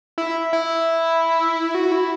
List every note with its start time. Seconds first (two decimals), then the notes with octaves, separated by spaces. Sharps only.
0.18 E4
0.53 E4
1.75 F#4
1.92 E4